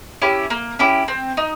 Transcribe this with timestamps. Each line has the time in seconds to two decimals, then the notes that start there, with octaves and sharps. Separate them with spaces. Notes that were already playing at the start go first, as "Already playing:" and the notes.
0.22 C#4 E4 G4
0.50 A#3
0.79 C#4 E4 G4
1.08 C4
1.37 D#4